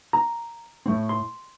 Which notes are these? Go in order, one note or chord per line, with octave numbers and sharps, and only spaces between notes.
A#5
A2 A3 C4
C6